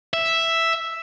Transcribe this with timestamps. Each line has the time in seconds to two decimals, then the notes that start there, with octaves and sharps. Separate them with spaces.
0.14 E5